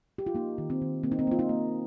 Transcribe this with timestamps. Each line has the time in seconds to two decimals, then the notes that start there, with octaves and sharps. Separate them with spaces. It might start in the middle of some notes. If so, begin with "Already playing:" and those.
0.18 G4
0.27 F4
0.35 A#3 D#4
0.58 D#3
0.70 C4
0.82 D#3
1.03 A#3 C4
1.12 D#4
1.19 C4
1.27 A#3 F4
1.39 D#4
1.49 A#3